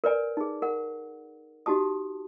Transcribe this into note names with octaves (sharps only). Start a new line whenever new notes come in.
A#4 B4 D5 G#5
D#4 G#4
A#4 F#5
D#4 F#4 G4 A5 D#6